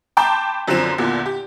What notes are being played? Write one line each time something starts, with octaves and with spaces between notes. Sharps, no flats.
G5 A5 B5 C6 D6 G6
F#2 D3 F3 C4 E7
E2 A#2 D3
G4